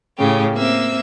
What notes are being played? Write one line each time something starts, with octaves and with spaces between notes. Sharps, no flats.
A2 C#3 C#4 G4
A#3 C4 E5